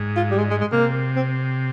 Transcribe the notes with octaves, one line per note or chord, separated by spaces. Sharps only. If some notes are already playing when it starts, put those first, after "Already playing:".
Already playing: G#2
F4
G3
G#3
G#3
G#3
C3 A#3
C4